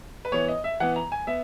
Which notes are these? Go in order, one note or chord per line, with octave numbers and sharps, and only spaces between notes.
B4
E3 B3 C#5
D#5
E5
E3 B3 F#5
A#5
G#5
B3 E5